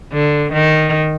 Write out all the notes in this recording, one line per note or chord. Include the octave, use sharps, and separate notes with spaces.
D3
D#3